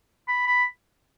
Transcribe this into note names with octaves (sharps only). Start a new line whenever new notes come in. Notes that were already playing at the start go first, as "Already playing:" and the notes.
B5
B5